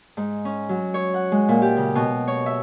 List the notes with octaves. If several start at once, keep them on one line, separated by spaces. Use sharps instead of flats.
G#2
C#4
F#3
C#5
F#5
G#3
A#2
G4
C#3
B2
C#5
E5